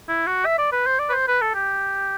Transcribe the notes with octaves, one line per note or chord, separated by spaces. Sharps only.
E4
F#4
E5
D5
B4
C5
D5
B4
C5
B4
A4
G4